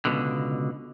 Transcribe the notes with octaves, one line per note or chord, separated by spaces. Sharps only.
C#2 B2 D3